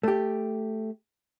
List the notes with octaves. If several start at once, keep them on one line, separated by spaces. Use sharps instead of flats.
A3 G4